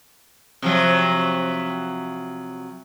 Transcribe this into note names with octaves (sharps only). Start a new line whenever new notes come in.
C3 F3 F#3